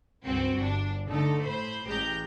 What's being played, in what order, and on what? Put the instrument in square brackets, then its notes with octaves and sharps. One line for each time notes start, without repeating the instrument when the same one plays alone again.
[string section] C#2 G2 C4 F#4
G1 D4
D3 A3 D#4 A4
A2 C5 B5
A1 G#3 G4 A#5 G6